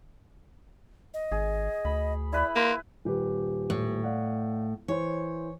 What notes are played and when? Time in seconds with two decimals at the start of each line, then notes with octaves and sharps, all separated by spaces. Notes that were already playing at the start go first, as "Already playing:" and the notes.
1.14 D#5
1.32 G#1 G#4
1.85 D2 B5
2.33 E4 B4 D5 B5
2.56 A#3 B4 C6
3.05 D#1 G4 B4
3.70 A2
4.03 D5 F5 F#5
4.88 E3 C5 C#5